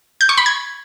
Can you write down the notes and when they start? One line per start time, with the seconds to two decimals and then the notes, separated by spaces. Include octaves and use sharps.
0.21 G6
0.29 C#6
0.37 B5
0.46 G#6